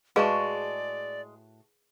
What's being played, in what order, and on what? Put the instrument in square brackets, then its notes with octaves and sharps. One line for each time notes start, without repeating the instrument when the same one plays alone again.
[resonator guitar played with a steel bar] A2 F#4 A5 [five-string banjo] G#3 [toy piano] G#4 B4 F5 [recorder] D5